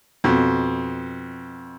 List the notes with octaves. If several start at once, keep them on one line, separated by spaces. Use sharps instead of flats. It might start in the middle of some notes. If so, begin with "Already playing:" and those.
F2 B2